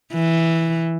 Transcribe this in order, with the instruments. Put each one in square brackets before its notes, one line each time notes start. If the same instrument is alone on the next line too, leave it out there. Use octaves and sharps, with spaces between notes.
[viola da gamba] E3